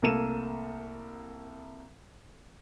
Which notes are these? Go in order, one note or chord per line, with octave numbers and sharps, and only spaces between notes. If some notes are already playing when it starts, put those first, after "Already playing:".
C2 A3 A#3 A4 D#7 E7